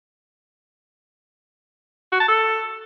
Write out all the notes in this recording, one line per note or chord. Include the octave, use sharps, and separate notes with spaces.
F#4
A5
A4